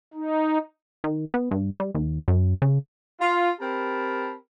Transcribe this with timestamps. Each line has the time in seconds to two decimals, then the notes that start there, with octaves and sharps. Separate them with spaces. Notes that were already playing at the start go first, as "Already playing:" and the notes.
0.14 D#4
1.04 D#3
1.34 B3
1.51 G2
1.80 G3
1.95 D#2
2.28 F#2
2.62 C#3
3.20 F4
3.60 C4 G4 A#4 A5 B5